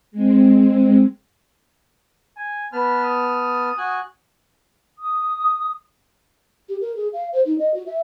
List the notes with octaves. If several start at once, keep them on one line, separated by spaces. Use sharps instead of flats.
G#3 C4
G#5
B3 B4 A5 F6
D#6
F#4 G#5 F#6
D#6
G4
A#4
G#4
F5
C5
D#4
D#5
F#4
E5